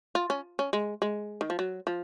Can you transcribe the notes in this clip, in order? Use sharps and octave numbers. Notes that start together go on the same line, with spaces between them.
F4
C#4
C#4
G#3
G#3
D#3
F3
F#3
F3